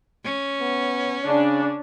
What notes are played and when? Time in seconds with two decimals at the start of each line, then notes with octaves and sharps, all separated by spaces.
0.24 C#4
0.61 B3
1.25 C#3 D4